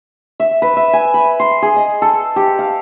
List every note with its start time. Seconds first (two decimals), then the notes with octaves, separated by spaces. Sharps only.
0.40 E5
0.62 B4
0.76 E5
0.93 G#5
1.14 B5
1.40 C6
1.62 G#4
1.76 D#5
2.02 A4
2.36 G4
2.59 F5